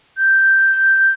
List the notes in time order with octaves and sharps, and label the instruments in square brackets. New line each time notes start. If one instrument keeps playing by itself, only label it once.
[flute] G6